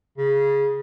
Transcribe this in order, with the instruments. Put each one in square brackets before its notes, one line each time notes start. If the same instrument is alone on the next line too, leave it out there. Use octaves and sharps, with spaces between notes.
[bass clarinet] C#3